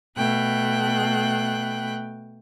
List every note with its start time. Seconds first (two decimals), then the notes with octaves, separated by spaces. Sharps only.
0.17 B2 A3 G5 F#6